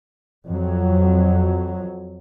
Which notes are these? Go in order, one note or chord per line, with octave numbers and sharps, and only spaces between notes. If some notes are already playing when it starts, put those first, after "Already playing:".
F2 F#3